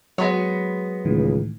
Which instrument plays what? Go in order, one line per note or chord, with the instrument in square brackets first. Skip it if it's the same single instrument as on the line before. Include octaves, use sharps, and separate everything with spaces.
[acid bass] F#3 [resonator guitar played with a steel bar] G#3 B3 C#5
[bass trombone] C#2 [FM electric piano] A2 D#3 E3